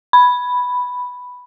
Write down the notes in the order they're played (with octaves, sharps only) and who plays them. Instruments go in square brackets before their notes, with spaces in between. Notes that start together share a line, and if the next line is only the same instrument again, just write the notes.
[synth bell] B5